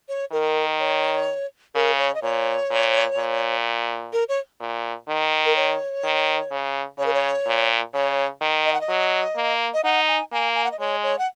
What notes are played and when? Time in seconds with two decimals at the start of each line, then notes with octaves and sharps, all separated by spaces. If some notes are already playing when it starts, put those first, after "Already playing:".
0.09 C#5
0.32 D#3 A#4
0.80 C#5
1.75 C#3 A#4
1.98 C#5
2.14 D#5
2.22 A#2 C#5
2.71 A#2
3.17 A#2
4.13 A#4
4.29 C#5
4.60 A#2
5.08 D#3
5.45 A#4
5.56 C#5
6.04 D#3
6.51 C#3
6.98 C#3 C#5
7.06 A#4
7.14 C#5
7.47 A#2
7.94 C#3 C#5
8.41 D#3
8.65 D#5
8.73 F#5
8.81 D#5
8.89 F#3
9.36 A#3
9.74 D#5
9.84 D#4 F#5
10.08 G#5
10.32 A#3 G#5
10.55 G#5
10.64 F#5
10.72 D#5
10.79 G#3 C#5
11.03 C#5
11.19 F#5